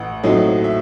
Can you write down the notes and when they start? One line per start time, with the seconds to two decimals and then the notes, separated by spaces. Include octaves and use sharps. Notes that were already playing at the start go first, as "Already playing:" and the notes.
Already playing: A1 F#5
0.23 A2 F#3 C4 D#4
0.64 E5